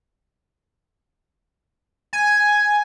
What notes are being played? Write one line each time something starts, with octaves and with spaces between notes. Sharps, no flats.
G#5